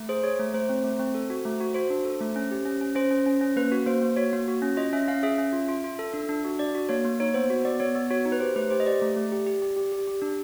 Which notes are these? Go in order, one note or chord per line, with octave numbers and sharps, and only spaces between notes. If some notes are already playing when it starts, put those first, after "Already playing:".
Already playing: A3
G#4 C5
G#4 C#5
A3
A3 C5
C4
A3
C4
A4
F#4
A3
F#4
F#4 C5
D4
A4
A3
C#4
G4
C#4
C#4
C#4 C5
C#4
C#4
C#4
A#3 B4
F#4
A#3 C5
A#3
F#4 C#5
A#3
F#4
C#4
F4 D#5
C#4 E5
C#4 F5
G#4 E5
C#4
F4
F4
F4
A4
D4
D4
F#4
D4 D5
F#4
A#3 C#5
A#3
D#4 C#5
B3 C5
F#4
B3 D5
B3 C#5
B3
F#4 C#5
D#4
B4
G4 C5
A3 B4
G4 C5
D#5
G4 D5
A3
A3
G4
G4
G4
G4
G4
G4
D4